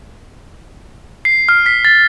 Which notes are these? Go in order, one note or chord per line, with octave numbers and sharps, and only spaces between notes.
C7
F6
B6
A6